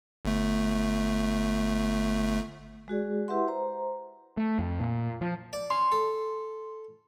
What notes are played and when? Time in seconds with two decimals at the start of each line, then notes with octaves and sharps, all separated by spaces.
0.25 G1 A3
2.88 G#3 F#4 G#4 D5
3.28 E4 G4 B4 E5 F#5 C6
3.48 C5 A#5
4.37 A3
4.59 F2
4.80 A#2
5.21 F3
5.53 D5
5.70 C#4 C6
5.92 A4